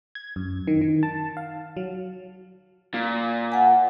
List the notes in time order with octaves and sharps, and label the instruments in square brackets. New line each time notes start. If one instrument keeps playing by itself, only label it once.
[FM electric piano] G#6
F#2
D#3
D#3
A5
F5
F#3
[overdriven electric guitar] A#2
[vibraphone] F#5 G#5